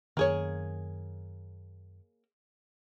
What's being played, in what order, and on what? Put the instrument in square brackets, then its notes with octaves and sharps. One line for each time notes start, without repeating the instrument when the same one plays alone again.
[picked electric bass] F#2 D#3 [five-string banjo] A#3 G#4 C#5